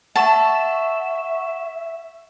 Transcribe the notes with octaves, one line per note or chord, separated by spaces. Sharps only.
E5 F#5 A5 C#6 E7